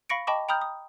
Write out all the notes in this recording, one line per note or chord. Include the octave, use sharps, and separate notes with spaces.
F5 B5 C#6 A#6 C#7 D7
D#5 G5 A5 B5 C#6 D6
G5 A#5 B5 D#6 F6 G6
D#6